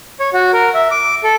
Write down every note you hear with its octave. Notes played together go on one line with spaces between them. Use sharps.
C#5
F#4
A#4
E5
D6
A4